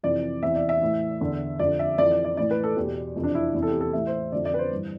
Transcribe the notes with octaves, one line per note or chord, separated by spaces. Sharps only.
F2 C3 E3 D5
E2 C3 E3 E5
D5
E5
A2 E3
E2 D3
F2 D3 D5
E5
F2 E3 D5
D5
D5
A2 E3 D5
B4
A4
E2 B2 G4
F2 C3 E3
D4
E4
E2 C3 E3 E4
A4
G4
A4
A2 E3 E5
C5
F2 D3 D5
D5
B4
C5
G2 E3